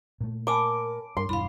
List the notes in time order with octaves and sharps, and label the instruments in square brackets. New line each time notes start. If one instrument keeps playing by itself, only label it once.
[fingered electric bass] A#2 A3
[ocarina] A#4 [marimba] G#5 A5 B5 [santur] D6
[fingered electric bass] G2 [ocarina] A#4 [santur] C6
[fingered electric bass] E1 G2 [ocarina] E4 [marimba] F5 B5